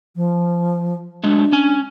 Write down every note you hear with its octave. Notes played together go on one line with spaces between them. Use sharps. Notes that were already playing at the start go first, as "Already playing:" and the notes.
F3
F#3 G#3 A3 D4
C#4 G#5